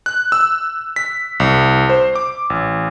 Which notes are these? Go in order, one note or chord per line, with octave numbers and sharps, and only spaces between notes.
F#6
E6
B6
C2
C5
D6
A1